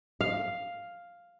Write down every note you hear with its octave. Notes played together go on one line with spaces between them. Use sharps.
F5